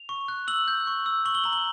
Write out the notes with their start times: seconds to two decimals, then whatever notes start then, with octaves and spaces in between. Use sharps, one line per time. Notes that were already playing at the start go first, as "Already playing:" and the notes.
Already playing: F7
0.09 C#6
0.28 F#6
0.48 E6 F#7
0.68 G6
0.87 C#6
1.06 E6
1.25 C#6 F#7
1.35 G7
1.44 A#5 F#7
1.53 G7